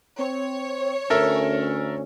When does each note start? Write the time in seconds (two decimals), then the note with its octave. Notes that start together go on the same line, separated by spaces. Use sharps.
0.19 C4 C#5
1.10 D2 C#4 A4 A#4 E5